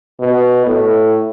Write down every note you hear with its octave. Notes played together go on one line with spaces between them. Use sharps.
B2
A2